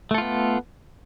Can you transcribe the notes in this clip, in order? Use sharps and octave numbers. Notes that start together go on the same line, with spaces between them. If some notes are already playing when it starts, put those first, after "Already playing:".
A3 B3 F4 A4